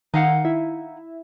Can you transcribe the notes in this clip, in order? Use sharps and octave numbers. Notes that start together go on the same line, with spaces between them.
D#3 D#4 F5 F#5
E4